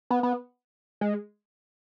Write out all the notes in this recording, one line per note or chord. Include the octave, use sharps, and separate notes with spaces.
B3
B3
G#3